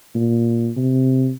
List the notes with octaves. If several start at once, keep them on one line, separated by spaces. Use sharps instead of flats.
A#2
C3